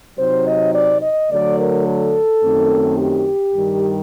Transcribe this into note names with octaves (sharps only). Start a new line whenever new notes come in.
C3 F#3 C4 D#4 C5
D#5
D5
D#5
D3 F#3 A3 D5
A#4
A4
F#2 D#3 A3 C4 D#4
G4
G2 D#3 G3